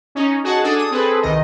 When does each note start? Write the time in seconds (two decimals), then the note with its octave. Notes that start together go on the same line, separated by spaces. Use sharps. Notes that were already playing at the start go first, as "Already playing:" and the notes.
0.15 C#4 D#4
0.44 F#4 G#4 D#5 F#5 A5
0.64 D4 G#4 A4
0.78 D#6
0.91 C4 G#4 A4 B4
1.22 C2 D#3 D#5